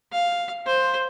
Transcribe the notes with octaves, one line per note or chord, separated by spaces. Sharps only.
F5
C5